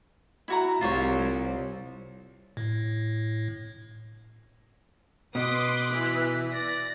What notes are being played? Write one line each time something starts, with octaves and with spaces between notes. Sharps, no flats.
E4 F#4 A#5
C2 F4 C5 C#5
A2
B2 B4 C6 D6 D#6
E3
D5 A#6